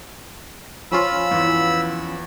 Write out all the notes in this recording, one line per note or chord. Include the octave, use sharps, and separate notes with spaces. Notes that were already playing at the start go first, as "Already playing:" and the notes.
F3 C#4 F4 B5 E6
E2 E3